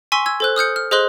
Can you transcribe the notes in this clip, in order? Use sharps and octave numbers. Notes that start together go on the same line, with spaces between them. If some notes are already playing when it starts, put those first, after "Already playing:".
G#5 C6 C#6 E6 B6
E6 G#6
A4 C5 F#6
D#6 F6 G6 C#7
F6
G#4 C5 D#5 C6 F#6 F#7